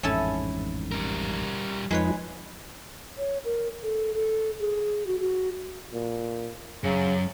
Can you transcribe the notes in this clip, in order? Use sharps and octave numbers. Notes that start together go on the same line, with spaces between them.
A1 F2 G#2 C#4 E4 A4
G3 A#4
F2 F3 G#3 D#4 B4 C#5
C#5
A#4
A4
A4
G#4
F#4
F#4
A#2
F#2 C#3